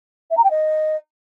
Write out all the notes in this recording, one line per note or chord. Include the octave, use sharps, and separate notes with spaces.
E5
A#5
G5
D#5